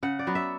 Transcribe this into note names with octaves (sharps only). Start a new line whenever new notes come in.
C#3 F#5
D5
F#3 B3
E5